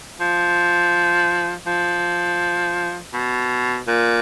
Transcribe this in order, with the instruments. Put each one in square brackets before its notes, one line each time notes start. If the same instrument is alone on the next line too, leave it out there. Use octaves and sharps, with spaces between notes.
[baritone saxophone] F3
F3
B2
A#2